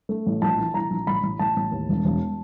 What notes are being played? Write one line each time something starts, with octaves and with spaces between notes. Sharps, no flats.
A3
A1
A#1 A5
E3
E3 A#5
A#1
A1 B5
A1
A1 A5
A1
D#2
E1
E1